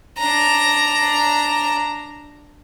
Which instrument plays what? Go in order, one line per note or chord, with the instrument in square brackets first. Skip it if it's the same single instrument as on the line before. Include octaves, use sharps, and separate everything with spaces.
[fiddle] D4 A#5